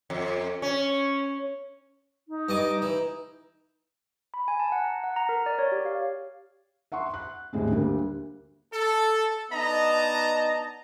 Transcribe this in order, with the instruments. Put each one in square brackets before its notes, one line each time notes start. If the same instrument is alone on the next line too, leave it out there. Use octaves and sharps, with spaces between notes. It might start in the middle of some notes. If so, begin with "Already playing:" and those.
[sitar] F2
C#4
[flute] D#4
[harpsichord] G2 D#5 D6
E3
[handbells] B5
G#5
A5
F#5
A#5
F#5
A#5
A#4
D5
C#5
G4
F5
[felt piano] E5 F#5 C6 C#6
F#6
D#2 A2 G#3 C4
D2 D3 G3 A#3
[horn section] A4
B3 D4 D#4 D#5 A5 A#5